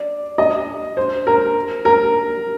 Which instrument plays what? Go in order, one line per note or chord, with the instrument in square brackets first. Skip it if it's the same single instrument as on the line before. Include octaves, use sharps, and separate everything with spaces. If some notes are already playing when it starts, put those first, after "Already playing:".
Already playing: [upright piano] D5
D#5
C5
A#4
A#4